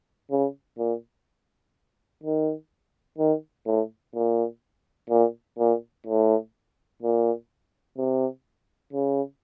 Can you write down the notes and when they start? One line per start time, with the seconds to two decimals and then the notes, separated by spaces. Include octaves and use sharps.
0.31 C#3
0.78 A#2
2.23 D#3
3.18 D#3
3.66 A2
4.15 A#2
5.10 A#2
5.59 A#2
6.07 A2
7.03 A#2
7.98 C3
8.93 C#3